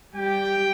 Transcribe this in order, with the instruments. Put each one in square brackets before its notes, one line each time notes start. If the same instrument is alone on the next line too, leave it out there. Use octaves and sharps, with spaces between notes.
[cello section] G3 G4 [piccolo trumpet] G5